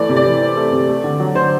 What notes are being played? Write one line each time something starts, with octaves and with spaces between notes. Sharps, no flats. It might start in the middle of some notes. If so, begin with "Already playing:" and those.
Already playing: E3 A3 D5
C3
D5
E3
C4
A3
C3
A3
D3
F#3
D3 C5